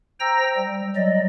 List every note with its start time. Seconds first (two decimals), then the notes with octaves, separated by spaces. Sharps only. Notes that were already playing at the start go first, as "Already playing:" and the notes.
0.20 C5 G5 A#5 E6 A#6
0.57 G3
0.96 F#3 G3 D5 D#5